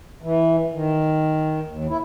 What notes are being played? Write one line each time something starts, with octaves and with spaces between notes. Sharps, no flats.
E3
D#3
D#2
E4